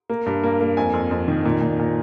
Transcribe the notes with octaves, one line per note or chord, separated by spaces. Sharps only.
A#3
G2
A#3
A#3
F2 G#5
F2
F2
D#3
A#2
A#2
A#2